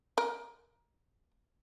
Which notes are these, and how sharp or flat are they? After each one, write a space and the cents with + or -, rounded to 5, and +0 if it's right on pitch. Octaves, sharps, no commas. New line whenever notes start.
A#4 +20